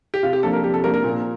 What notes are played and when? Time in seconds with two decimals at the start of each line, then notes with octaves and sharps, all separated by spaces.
0.14 G4
0.23 C3 F4
0.33 G4
0.43 F3 A#3 D4 A4
0.53 A#4
0.63 C3 G4
0.74 A4
0.84 F3 A#3 D4 A#4
0.94 A#4
1.04 A#2